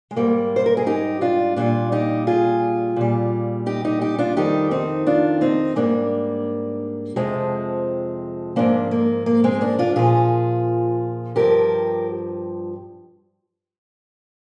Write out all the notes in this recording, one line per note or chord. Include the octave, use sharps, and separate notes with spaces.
G#3
G#2 G3 A#3
C5
A#4
G#4
D#4 G4
D4 F4
A#2 G3 D4 F4
D#4 G4
F4 G#4
A#2 G3
D#4 G4
D#4 G4
D#4 G4
D4 F4
F2 D#3 G3 D#4 G4
C4 D#4
D4 F4
C4 D#4
G#2 G3 A#3 D4
F2 C3 F3 G#3 C4
G#2 F3 A#3 D4
A#3
A#3
G#3 C4
A#3 D4
D4 F4
A#2 F3 F4 G#4
G2 F3 G4 A#4